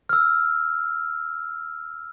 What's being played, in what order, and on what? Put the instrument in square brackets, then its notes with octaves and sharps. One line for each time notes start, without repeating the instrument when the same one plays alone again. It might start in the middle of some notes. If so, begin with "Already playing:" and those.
[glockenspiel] E6 F6